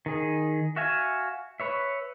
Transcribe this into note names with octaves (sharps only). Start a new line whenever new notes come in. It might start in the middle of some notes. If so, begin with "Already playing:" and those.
D#3 G#4
F#4 E5 F5 G#5
B4 C#5 E5